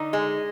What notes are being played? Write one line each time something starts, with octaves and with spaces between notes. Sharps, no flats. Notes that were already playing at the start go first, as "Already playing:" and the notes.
Already playing: D3 D#4
G#3